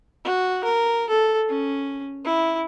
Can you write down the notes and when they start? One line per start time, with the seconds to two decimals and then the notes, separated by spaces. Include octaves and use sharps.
0.24 F#4
0.64 A#4
1.10 A4
1.48 C#4
2.25 E4